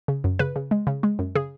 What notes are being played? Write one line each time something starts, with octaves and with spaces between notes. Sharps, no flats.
C#3
F#2
C#3 B4
C#3
G#3
C#3
G#3
F#2
C#3 G#4